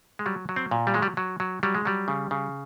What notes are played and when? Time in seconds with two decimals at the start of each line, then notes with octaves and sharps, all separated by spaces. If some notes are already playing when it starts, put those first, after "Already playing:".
0.19 G#3
0.26 F#3 G3
0.49 F#3
0.56 C4
0.71 A#2
0.87 G3
0.94 F#3 G#3
1.02 G3
1.17 F#3
1.40 F#3
1.63 F#3 G3
1.75 G#3
1.85 F#3 G3
2.08 C#3
2.31 C#3